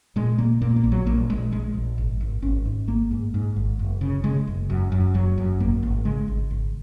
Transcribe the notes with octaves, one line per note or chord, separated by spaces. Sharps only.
A#2 G#3
A#2 A#3
A#2 A#3
A#3
A#1
F#3
A#1 A#3
A#1 G#3
A#1 G#3
A#1
G#1
G#1
G#1 C#4
G#2
G#1 A#3
G#2
G#2
G#1
F#1
C#3
C#3 G#3
F#1
F#2
F#2
F#1 F#3
F#2
G#1 A#3
G#1
C#3 G#3
G#1
G#1